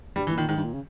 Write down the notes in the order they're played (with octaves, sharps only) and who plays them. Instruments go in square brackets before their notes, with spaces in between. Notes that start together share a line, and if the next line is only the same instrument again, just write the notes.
[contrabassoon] G2 [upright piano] G3
[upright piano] E3
[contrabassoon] A#2
[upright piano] D#3
[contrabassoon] G#2 [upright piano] D#3
[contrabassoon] G2
A#2
C#3